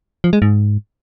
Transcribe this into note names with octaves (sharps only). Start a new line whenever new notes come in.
F3
G#3
G#2